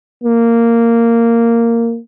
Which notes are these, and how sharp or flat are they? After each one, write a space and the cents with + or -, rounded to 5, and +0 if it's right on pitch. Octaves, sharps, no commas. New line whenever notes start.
A#3 -10